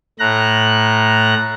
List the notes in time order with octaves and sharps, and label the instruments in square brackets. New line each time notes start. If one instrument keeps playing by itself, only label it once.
[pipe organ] A2 A#5 F#6